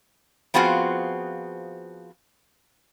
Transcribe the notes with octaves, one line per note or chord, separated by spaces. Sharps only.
F3 B3 C4 F4 F#4 G#4